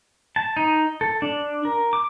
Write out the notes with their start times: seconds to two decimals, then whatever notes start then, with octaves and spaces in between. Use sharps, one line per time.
0.36 A5
0.57 D#4
1.01 A4
1.22 D4
1.65 A#4
1.93 D6